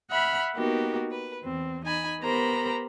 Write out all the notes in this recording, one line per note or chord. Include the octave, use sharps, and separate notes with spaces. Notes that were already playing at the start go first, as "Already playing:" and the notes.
E5 F#5 B5 F6
A#3 B3 D#4 F#4 G4 A#4
B4
E2 C4
D#4 G#5 B5
B3 G4 A#4 C5 A#5 B5